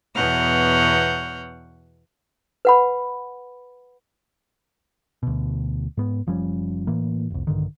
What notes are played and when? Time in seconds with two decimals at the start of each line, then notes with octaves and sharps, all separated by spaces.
0.15 E2 B2 C#5 F#5 F6 G6
2.65 B4 F#5 B5
5.23 D2 B2
5.97 G#2 B3
6.27 F#1 F3 G3 C#4
6.87 A2 E3 A#3
7.30 F1 C2
7.47 A#1 G2 D3 D#3